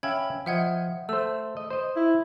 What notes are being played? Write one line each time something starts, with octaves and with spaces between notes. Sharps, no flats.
C#4 E5 F5 G5 B5 G#6
F3 D#5 E5 F#5 G#6
A3 C5 E6
D#5
C5 D#5
E4